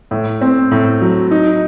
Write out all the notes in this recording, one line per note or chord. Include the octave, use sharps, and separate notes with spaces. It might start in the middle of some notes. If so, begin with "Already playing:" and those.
A2
C4
A2
F#3
D#4